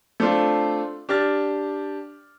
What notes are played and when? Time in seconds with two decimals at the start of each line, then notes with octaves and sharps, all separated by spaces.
0.20 A3 C4 D4 F4
1.09 D4 G4 F6 A6